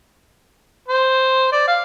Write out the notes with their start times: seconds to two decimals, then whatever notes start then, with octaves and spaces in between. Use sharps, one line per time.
0.88 C5
1.52 D5
1.68 F5